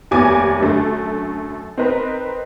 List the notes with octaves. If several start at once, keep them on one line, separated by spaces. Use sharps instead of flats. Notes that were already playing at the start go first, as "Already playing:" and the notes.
F1 D#2 B3 G#5 D6 G#6
F#2 D3 A3
C4 D#4 A#4 B4